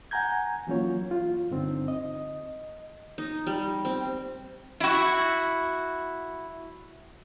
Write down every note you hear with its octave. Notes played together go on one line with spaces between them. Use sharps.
F#5 G#5 A#5 G6 G#6
E3 F#3 A#3 C#4 F4 C#5
F4
G2 D3 C4 D#4
D#5
D#4
G3
C4
E4 F#4